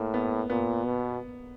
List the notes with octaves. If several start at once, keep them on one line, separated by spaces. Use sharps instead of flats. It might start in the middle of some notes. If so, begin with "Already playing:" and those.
Already playing: A2 A#3
B3
A#2 B3
B2